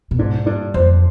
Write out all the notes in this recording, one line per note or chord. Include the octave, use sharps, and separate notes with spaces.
B2
G#2 D4
G2 D4
F2 C5